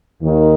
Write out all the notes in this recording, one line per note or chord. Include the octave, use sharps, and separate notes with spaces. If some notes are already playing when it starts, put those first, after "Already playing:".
D#2 D#3